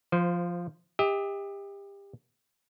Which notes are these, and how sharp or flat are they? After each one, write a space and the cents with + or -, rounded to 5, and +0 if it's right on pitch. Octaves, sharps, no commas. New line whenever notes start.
F3 +0 C5 -20
G4 +30 D#5 +45